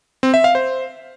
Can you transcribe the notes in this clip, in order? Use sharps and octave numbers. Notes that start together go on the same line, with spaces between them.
C4
E5
F5
C5